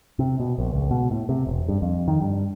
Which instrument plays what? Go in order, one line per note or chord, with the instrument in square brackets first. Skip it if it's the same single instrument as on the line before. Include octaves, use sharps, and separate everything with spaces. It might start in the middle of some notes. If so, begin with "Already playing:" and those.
[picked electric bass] C3
B2
A#1
C#2
B2
A2
C3
E1
G2
F2
D#3
G2